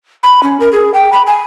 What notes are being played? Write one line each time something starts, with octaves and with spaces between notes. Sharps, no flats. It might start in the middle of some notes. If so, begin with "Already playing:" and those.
B5
C#4
A#4
G#4
G5
B5
G#5